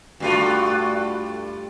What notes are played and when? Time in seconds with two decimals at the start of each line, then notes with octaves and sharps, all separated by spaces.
0.20 G2 A3 F4 F#4